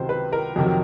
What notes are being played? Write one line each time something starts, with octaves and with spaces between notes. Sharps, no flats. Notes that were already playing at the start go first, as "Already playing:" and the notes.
Already playing: C#2 C3 D#3 F#3 C5
B4
A#4
F2 C3 D#3 F#3